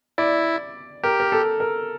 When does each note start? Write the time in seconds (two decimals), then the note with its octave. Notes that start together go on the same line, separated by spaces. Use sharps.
0.18 E4 D5
1.03 G4 A#4
1.20 A#4
1.32 A4
1.60 A#4